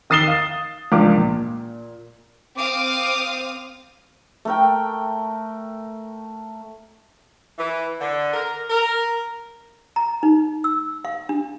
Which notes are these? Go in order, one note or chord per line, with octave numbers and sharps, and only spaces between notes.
D#3 D#6 A6 C7 E7 G7
F5 D#6
C#2 F3 D4 F4 A#4 D6
A#2
C4 F5 D6 D#6
A3 A#4 G5
E3
D3
A#4
A#4
A#5
D#4
E6
F5
D4